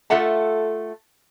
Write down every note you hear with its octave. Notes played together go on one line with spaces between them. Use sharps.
A3 F4 A4 E5 F#5 A5